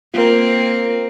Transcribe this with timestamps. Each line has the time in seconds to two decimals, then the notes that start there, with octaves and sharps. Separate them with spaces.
0.14 A#3 C4 F4 A#4